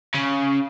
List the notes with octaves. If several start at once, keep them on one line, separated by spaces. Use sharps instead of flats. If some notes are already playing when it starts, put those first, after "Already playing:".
C#3